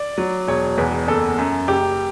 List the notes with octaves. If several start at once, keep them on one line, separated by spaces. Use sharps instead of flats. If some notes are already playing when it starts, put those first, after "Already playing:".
Already playing: D5
F#3
E1 C#5
E2 B4
F#1 A4
F#2
F#1 G4